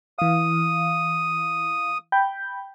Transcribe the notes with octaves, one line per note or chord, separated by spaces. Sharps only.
E3 F5 D#6
G5 B5 G6